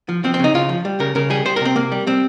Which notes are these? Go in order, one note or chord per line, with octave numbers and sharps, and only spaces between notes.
F3
F3 C4
C4
C#3 D#4
C#3 F4
F3
G3
C#3 A#4
C#3 A#4
G3 G#4
G3 C5
A#4
C3 C4
C3 A#3
G3
G3 C4